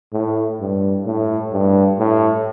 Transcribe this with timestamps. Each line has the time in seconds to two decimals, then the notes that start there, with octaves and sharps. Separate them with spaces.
0.13 A2
0.60 G2
1.06 A2
1.52 G2
1.99 A2